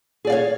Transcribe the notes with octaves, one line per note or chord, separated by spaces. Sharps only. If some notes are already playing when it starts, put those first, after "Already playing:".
G#4 C#5 D5 F5